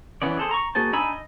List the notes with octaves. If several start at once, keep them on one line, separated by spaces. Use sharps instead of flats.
E3 B3 C#4 D5
G#4 A4 C5
A#5 C#6
A#3 F#4 G#4 C5 A5
D4 D#4 G#5 B5 E6
D#5